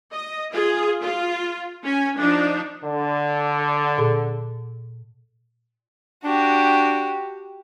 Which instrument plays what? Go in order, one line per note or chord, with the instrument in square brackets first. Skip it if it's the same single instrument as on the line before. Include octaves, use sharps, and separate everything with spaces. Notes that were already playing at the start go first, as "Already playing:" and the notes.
[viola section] D#5
F4 G#4
F4
C#4 G#5
F3 D4 D#4
[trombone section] D3
[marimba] A#2 G#4 A4
[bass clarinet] D4 [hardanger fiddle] F#4 G4